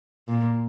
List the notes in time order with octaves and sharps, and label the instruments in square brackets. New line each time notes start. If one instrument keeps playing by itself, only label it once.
[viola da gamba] A#2